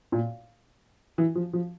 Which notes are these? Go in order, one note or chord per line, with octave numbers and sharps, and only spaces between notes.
A#2
E3
F3
F3